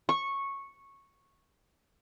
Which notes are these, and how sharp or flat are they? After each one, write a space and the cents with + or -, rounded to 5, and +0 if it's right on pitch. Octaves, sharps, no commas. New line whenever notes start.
C#6 -10